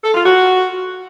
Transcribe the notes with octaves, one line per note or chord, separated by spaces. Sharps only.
A4
F4
F#4